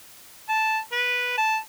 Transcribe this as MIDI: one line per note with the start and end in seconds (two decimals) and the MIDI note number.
0.49 0.79 81
0.92 1.37 71
1.37 1.58 81